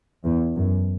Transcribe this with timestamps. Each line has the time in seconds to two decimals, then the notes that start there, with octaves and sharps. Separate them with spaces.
0.24 E2
0.55 F#2